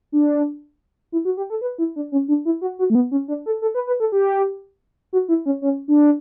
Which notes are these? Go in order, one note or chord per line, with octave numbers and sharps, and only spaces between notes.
D4
E4
F#4
G4
A4
B4
E4
D4
C#4
D4
E4
F#4
F#4
A3
B3
C#4
D4
A4
A4
B4
B4
A4
G4
F#4
E4
C#4
C#4
D4